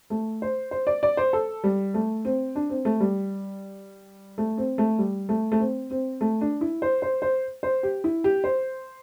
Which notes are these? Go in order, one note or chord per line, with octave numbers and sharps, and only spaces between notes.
A3
C5
C5
D5
D5
C5
A4
G3
A3
C4
D4
C4
A3
G3
A3
C4
A3
G3
A3
A3
C4
C4
A3
D4
E4
C5
C5
C5
C5
G4
E4
G4
C5